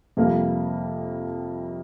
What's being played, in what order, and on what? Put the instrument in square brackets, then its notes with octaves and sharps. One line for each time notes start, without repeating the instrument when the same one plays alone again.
[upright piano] F2 C3 G3 A#3